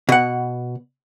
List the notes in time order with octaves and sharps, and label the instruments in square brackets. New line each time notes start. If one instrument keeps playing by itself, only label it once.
[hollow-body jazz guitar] B2 F#5